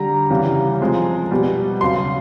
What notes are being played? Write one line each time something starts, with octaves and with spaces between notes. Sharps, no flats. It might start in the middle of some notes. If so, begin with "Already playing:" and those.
Already playing: D3 G3 A#5
C#3 E3 G3
C3 F3 G#3
B2 G3
C#3 F#3 C6